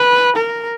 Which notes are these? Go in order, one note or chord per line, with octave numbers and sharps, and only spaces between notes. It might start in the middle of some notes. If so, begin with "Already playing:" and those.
Already playing: B4
A#4